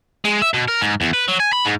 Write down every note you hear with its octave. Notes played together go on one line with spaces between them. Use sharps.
G#3
E5
B2
A#4
G#2
E2
B4
F#3
G#5
B5
G#2